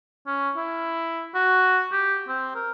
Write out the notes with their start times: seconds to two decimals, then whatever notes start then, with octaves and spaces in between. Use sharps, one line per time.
0.26 C#4
0.57 E4
1.34 F#4
1.92 G4
2.28 C4
2.55 A#4